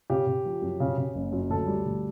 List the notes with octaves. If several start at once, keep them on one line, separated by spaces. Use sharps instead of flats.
C#3 G4
C#3
F3
F#2
C#3
C#3
F#1
F#2
D2 A4
G3
D2